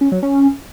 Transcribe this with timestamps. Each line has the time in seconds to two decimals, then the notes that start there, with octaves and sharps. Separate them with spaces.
0.01 C#4
0.12 F#3
0.23 C#4